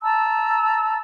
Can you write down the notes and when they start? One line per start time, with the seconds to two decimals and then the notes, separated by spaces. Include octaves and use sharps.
0.02 A5 A#5 E6